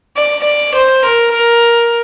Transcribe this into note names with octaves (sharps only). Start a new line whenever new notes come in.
D5
D5
C5
A#4
A#4